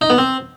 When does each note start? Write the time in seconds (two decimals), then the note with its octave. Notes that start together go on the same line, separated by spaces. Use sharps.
0.01 D#4
0.10 B3
0.18 C4